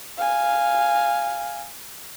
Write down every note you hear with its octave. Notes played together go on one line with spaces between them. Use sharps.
F5 G#5